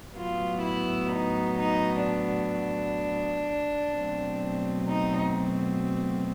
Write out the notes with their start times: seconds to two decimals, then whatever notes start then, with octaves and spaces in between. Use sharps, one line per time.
0.16 A2 F#3 B3 F4
0.63 E4
1.10 D#4
1.58 D#4
2.05 D4
3.94 B2 F#3 A3 C4
4.88 D#4